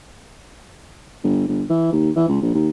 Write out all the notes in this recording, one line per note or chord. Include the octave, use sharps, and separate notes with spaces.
G1
G1
E3
D#2
E3
C#2
A#1
D#2